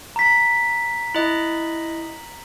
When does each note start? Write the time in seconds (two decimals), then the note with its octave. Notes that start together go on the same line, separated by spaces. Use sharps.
0.16 A#5 B6
1.15 E4 D#5 F#7